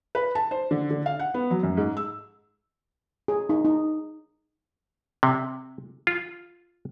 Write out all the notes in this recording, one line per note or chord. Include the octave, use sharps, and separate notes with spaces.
B4
A5
C5
D3
D3
F5
F#5
B3
F#3
F#2
G#2
E6
G#4
D#4
D#4
C3
F4